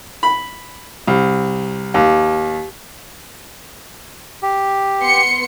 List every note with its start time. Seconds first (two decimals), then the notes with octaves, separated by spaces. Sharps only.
0.23 B5
1.08 C2
1.94 D#2
4.43 G4
5.01 B3 C6 C#7